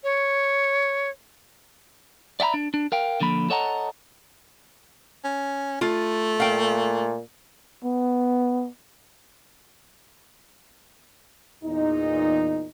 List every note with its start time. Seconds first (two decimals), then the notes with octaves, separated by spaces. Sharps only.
0.04 C#5
2.40 D5 E5 F#5 A#5 B5
2.54 D4
2.74 D4
2.92 A#4 F5 G5
3.20 D3 F3 A#3 B5
3.50 A4 C#5 D#5 F#5 A5 A#5
5.24 C#4
5.81 A3 F4
6.40 A#2 F5 G5
7.84 B3
11.64 E2 A#2 D#4